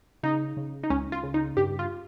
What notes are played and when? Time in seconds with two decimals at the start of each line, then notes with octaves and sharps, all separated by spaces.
0.23 C#3 D#4
0.57 C#3
0.83 D#4
0.90 C#2 C#4
1.12 F4
1.23 C#3
1.34 D#4
1.57 G2 G4
1.79 F4